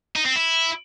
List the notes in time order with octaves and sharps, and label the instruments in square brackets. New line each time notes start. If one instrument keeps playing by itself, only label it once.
[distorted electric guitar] D#4
C4
E4